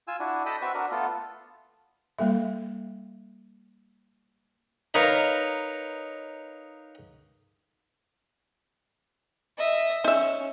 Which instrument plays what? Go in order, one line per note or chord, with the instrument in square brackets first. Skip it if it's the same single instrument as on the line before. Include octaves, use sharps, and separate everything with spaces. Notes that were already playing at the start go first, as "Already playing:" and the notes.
[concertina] F4 G#5 E6
D4 E4 F#4
A4 D#5 G5 A5 B5 D#6
C4 F#4 B4 E5
D4 F#4 A#4
A3 B3 F4 A4
[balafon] G3 A#3 A4 E5
[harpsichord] D#4 A#4 B4 C#5 F5
[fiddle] D#5 E5
[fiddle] C#4 [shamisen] D#4 E5